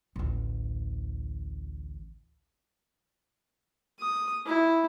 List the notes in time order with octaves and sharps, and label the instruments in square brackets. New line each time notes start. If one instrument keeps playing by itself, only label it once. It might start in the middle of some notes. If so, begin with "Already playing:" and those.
[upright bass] A1 D2
[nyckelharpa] D#6
E4